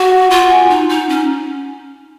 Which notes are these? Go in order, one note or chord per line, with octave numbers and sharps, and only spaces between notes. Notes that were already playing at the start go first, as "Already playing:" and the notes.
Already playing: F#4 F#5
F4
F#5
G#5
D#4
D#4
C#4